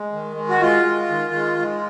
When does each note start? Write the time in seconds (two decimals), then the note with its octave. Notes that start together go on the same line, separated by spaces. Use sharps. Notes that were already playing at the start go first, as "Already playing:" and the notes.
Already playing: G#3
0.12 D#3
0.36 G#3
0.49 F#4
0.61 G#3 F4
0.86 G#3
1.10 D#3
1.34 G#3
1.58 G#3